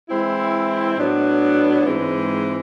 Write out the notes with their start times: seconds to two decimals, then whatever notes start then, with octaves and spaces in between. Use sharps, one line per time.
0.09 E3 G#3 C4 E4
0.98 A2 F#3 B3 D4
1.86 G#2 E3 G#3 C4